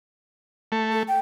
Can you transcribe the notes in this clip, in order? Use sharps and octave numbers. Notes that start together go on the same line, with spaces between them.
A3
A4
G5